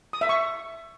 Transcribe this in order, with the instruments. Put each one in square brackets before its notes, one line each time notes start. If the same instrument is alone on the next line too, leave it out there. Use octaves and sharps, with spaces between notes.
[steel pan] D#6
E5
C#6